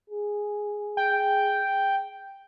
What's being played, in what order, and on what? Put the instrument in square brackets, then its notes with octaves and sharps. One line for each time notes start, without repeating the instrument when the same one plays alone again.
[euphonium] G#4
[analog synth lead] G5